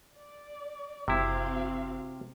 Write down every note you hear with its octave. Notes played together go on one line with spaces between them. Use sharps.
D5
F#1 C3 C4 E4 F#4 F5